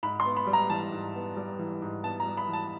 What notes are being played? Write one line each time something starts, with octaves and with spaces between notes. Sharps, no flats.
G#2 B5
C6
B3
B5
G3
A#5
E3 A5
G#2
B3
G3
E3
G#2
B3 A5
A#5
G3
B5
E3
A5